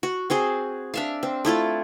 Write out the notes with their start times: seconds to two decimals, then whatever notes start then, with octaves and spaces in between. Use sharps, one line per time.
0.03 F#4
0.30 C4 F#4 G#4 C5
0.94 D4 E5 F5
1.23 C4
1.45 A3 E4 F4 A4